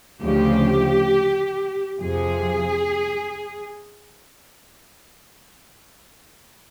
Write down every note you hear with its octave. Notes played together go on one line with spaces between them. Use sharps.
D2 C#3 F3 G4
F2 C3 F3 G#4